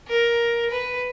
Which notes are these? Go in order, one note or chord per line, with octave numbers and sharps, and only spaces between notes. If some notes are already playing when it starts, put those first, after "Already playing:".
A#4
B4